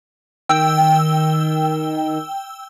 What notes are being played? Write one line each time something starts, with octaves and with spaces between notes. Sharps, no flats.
D#3 G5 E6